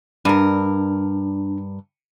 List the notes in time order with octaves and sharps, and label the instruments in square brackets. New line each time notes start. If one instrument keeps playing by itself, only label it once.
[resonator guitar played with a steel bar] G2 A#4 [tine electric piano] D4